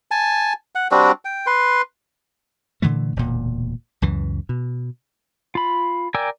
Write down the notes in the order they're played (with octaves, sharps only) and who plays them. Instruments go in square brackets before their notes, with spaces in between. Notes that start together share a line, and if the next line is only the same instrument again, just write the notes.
[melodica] G#5 A5
F#5
G3 C4 D4 F#4
G5
B4 C6
[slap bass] A#2 D3 E3 A3
E1 D2 A#2
C#2 F#2 E3
B2
[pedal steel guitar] F4 B5
A#4 D5 G5 G#5 E6